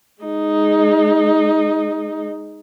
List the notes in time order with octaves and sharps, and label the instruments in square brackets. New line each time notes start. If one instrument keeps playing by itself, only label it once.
[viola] G#3 D#4